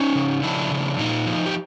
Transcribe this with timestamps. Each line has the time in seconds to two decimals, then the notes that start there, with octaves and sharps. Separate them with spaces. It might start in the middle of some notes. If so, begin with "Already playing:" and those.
Already playing: C#4 D#4
0.15 C#3
0.43 F3 D4 E4
0.71 C#3
0.99 A#2 D#4 F4
1.26 F3
1.46 G4